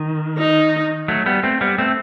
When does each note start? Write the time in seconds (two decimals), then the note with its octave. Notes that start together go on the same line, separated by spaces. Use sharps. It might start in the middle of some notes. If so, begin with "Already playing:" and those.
Already playing: D#3
0.38 D#4
1.08 F#3 A3
1.26 G3 B3
1.43 A3 C4
1.61 G3 B3
1.78 A3 C4